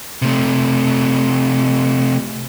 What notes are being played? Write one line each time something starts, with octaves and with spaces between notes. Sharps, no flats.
C3 A3